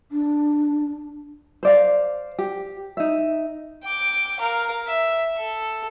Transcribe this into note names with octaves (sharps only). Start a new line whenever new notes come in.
D4
C5 D5 F5
G4
D#4 E5
G5 D6
A#4 F5
E5
A4